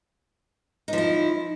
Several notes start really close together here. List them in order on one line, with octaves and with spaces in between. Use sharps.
D#4 F3 E4